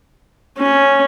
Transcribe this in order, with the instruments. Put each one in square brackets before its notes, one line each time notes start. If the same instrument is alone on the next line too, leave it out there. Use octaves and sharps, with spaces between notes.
[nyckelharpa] C#4